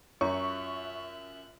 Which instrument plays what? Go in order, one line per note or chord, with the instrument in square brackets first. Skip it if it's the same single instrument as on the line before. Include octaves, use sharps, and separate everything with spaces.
[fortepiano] F#2 [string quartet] F4 E5 F#6 [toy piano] C#5 A#5 [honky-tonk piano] C#6